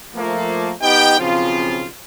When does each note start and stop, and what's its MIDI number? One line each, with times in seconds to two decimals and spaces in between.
0.15 0.72 53
0.15 0.72 57
0.15 0.72 58
0.82 1.17 59
0.82 1.17 63
0.82 1.17 67
0.82 1.17 75
0.82 1.17 79
1.19 1.87 35
1.19 1.87 49
1.19 1.87 53
1.19 1.87 60
1.19 1.87 65